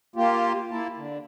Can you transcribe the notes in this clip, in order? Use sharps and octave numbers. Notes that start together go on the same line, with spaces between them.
A#3 F4 G4
A#3 E4 A5
D3